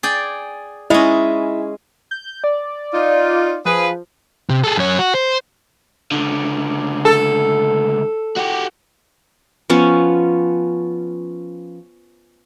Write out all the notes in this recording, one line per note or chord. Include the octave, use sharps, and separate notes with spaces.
G#4 D5 G5
G#3 C#4 E4 D#5 E5
G6
D5
D#4 F4
F3 G#4 B4
C3
G#4 A4
F#2 C#5
F#4
C5
C#2 D3
A4
F#4 G4
F3 B3 C#4